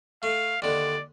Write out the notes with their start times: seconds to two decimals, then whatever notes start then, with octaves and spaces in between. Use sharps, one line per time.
0.23 A3 F5
0.62 D#2 D3 D5